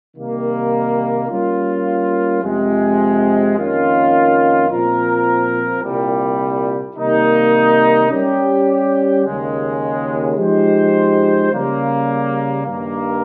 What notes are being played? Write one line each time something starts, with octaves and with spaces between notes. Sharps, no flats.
C3 D#3 G3 A#3
G3 A#3 C#4 F4
F2 C3 F3 G#3
F2 D#3 A#3 C#4 F4
A#2 F3 C4 F4 A#4
C2 A#2 G3
C3 D#3 G3 A#3 D#4
G3 C#4 G4
D#2 C#3 G#3
F3 G#3 D#4 G4 C5
C#3 G3 A#3
G2 D#3 A#3